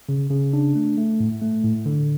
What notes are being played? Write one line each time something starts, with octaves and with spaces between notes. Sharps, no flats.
C#3
C#3
D4
A3
A3
A2
A3
A2
D3